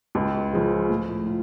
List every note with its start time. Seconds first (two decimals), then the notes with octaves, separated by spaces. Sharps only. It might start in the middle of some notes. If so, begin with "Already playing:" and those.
0.15 C#2
0.53 C#3 F3
0.89 A2
1.26 F4